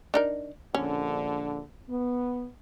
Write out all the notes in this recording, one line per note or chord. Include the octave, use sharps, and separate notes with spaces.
D4 D#4 A#4
A#1 D3 C#4
B3